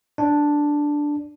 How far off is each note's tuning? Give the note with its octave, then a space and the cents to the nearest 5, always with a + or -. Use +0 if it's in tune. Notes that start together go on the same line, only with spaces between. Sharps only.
D4 +0